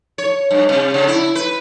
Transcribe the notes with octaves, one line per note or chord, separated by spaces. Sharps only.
C#5
G2
C3
C#3
E4
B4